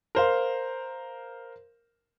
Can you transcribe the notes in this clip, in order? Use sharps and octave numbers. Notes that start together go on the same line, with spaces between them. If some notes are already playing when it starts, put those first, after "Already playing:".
A#4 C5 F5